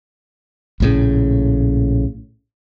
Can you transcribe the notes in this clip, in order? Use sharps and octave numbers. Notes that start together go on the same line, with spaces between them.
A#1 A2 C#3